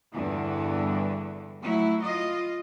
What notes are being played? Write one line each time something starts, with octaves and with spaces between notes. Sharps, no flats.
E2 G2 D3 E3
F#3 A3 E4
F4 D#5